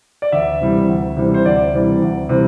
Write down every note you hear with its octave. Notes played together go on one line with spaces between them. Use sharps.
D5
D2 E5
C3 E3 G3
D2
C3 E3 G3
C5
D2 D5
C3 E3 G3
D2
C3 E3 G3